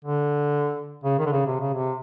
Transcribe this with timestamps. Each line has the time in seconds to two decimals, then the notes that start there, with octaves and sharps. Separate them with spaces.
0.05 D3
1.04 C#3
1.19 D#3
1.26 D3
1.32 C#3
1.47 C3
1.61 C#3
1.74 C3